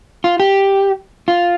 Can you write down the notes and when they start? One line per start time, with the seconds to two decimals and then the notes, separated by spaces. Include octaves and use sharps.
0.24 F4
0.40 G4
1.28 F4